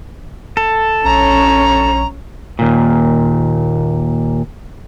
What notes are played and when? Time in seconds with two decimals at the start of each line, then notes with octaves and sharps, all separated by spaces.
0.57 A4
1.05 A#1 C#4 C#5 A#5
2.59 D#2 A#2